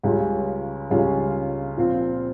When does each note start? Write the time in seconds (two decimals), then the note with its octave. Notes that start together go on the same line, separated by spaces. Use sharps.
0.03 C#2 C#3 G3 C#4 F4
0.90 C#2 C#3 G3 C#4 F4
1.77 A#2 F3 C4 F4